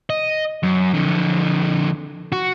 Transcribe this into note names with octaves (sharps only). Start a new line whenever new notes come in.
D#5
F#2
F2 D3
F#4